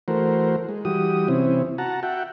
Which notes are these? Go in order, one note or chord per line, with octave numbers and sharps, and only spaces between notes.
E3 A3 F#4 A#4 C5
G#3
E3 G3 F#4 G4 D#6
C3 E3 C4 C#4 E4
F#4 F#5 A5 A#5
F#4 E5 F#5 G5